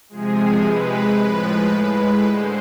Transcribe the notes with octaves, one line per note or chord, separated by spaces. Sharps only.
C3 F3 G#3 G#4
C3 G#3 B4
A2 F3 G#3
A2 G#3 B4
D3 G#3 C5